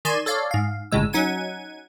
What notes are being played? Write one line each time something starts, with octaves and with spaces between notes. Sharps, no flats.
D#3 D5 G#5 C6 G#6 E7
A4 C#5 D5 F5
G#2 F5
G1 A2 C#3 G#3 E6
F#3 C#4 D#4 F#5 G#6 D#7